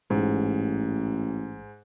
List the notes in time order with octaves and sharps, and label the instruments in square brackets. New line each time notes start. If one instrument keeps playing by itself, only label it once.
[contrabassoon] A1 [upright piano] G#2